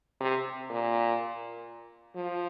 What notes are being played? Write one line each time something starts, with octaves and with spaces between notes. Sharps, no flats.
C3
A#2
F3